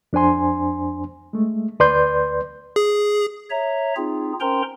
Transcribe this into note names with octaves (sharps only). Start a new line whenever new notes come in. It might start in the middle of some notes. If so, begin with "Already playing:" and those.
F2 D4 C5 G#5 C6
G#3 A3
D2 B4 D5 C6 G6
G#4
C#5 E5 A#5
C4 D#4 F4 G#4
C#4 A#4 C5 G5 A#5 C6